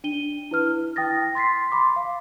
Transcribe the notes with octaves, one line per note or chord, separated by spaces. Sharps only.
D4 D#7 G7
E4 B4 F6
E4 G5 D#6 A6 A#6
C6 A6 B6 C7
B5 C6 D6
F5